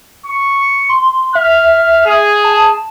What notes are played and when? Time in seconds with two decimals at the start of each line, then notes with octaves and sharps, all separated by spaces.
0.26 C#6
0.89 C6
1.35 E5 F6
2.06 G#4
2.44 A5